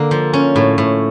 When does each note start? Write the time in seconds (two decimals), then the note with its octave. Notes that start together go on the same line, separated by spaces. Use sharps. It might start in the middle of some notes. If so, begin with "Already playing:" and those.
Already playing: D3 A#3
0.11 F3
0.33 C#4
0.56 A2
0.78 A2